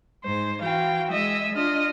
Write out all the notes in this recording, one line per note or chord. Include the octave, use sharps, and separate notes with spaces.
G#2 C5
E3 F#4 F5 G5
G#3 D#5 E5
D4 F4 D#5 F6